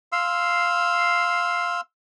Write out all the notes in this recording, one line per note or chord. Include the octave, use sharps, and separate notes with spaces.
F5 C6 E6